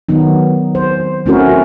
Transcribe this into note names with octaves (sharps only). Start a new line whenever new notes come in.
D#3 F#3 B3 D#4
C5
A3 C4 C#4 E4 F#4 A#4